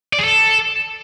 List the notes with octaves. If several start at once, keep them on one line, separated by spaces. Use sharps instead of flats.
D5
G#4
A4